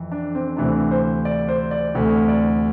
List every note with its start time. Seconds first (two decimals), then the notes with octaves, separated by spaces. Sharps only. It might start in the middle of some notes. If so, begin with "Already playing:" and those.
Already playing: F2 E3
0.12 D4
0.35 C4
0.57 D2 C3 E3 D4
0.91 C5
1.25 D5
1.49 C5
1.71 D5
1.94 D2 C3 E3 A3 C4
2.28 D5